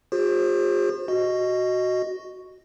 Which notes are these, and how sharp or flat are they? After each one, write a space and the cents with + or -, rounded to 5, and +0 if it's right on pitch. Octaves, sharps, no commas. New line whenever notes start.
F4 +45 G#4 -40 C5 +25
F#4 +0 D#5 +0